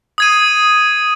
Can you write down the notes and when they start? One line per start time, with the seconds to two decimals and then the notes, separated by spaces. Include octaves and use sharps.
0.18 D#6 G#6 D#7